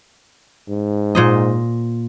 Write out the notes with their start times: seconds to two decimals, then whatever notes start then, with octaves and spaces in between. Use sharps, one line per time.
0.69 G#2
1.15 A#2 C5 D#5